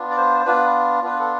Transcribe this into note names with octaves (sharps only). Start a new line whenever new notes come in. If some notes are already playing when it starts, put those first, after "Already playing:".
Already playing: B3 D4 F4
D5
C5
C5
B3 D4 F4 B4
B3 D4 F4 B4
A4